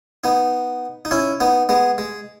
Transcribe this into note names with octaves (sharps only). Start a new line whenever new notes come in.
B3 D#4
D#4
C#4 E4
B3 D#4
G#3 B3
G#3